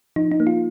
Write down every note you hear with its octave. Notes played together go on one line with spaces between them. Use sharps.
F3 D#4
D#4
A#3
F4